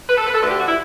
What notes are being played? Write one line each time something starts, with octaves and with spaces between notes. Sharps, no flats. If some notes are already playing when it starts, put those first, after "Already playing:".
B4
A4
B4
A4
D2 D3 A3 B4
G4
F#4
E4